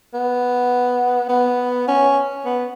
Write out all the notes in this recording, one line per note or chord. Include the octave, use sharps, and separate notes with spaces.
B3
B3
C#4
B3